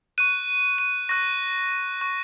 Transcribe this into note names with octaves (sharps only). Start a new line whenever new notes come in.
C#6 F#6 D#7
D#7
C#6 F#6 A#6
C#6 F#6